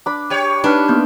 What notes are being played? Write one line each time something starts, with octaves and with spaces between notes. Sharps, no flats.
D4 B5
G4 C#5
D4 D#4 B4 B5 F6
A#3 B3 G6